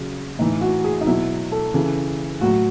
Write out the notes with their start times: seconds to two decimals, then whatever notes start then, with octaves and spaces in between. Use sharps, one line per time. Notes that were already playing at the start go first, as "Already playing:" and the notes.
Already playing: C#3 F#3
0.39 A2 E3 D#4
0.61 F#4
0.84 G#4
1.01 D#4
1.07 B2 F#3 E4
1.52 A4
1.74 C#3 E3
2.41 A2 F#3 F#4